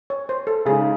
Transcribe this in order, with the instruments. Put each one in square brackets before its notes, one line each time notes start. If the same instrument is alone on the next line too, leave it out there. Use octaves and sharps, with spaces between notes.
[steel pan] C#5
C5
A4
[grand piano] C#3 G#3 D#4 [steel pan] G#4